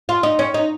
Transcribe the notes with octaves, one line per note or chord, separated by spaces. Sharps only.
F4
D#4
C#4
D#4